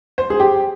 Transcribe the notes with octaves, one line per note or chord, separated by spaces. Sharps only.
C5
G#4
G4